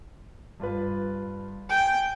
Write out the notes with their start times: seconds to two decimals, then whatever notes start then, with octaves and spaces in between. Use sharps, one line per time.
0.60 G2 F4 B4
1.69 G5 G#5